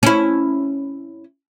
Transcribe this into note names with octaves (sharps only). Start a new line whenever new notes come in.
C#4 E4